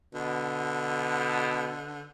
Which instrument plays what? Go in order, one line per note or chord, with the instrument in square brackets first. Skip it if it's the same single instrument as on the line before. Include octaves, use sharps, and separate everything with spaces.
[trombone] B2 [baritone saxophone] D3